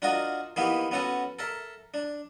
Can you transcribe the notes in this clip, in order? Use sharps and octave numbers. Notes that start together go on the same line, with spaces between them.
D4 F4 F#4 A#4 D#5
E3 A#3 B3 D#4 E4 G4
B3 C#4 F#4 A4
A4 A#4 E5
D4